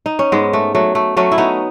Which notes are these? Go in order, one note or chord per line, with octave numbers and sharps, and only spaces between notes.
D#4
C#4
G#2 G#3 B3
A3
F#3 A3
A3
F#3 A3 C#4
E4
B3 D#4